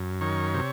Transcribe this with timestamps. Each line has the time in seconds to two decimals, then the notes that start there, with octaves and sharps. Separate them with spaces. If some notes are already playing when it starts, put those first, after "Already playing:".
Already playing: F#2
0.21 D#3 C#5
0.54 C3